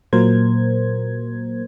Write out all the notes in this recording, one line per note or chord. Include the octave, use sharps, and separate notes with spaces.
A#2 F#3 A#3 A#4 C5 G#6